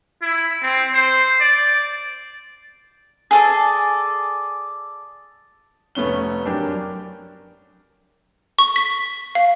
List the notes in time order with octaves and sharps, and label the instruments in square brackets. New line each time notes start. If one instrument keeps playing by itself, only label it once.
[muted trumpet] E4
C4
C5
D5
[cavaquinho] G#4 A4 D5
[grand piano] F1 A3 B3 C#4 G7
F#2 D4 G4 A#4
[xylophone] C#6
B6
F5